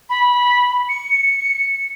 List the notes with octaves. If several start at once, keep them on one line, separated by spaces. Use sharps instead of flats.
B5
C#7